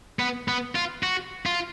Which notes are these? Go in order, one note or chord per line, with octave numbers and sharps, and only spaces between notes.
B3
B3
F4
F#4
F4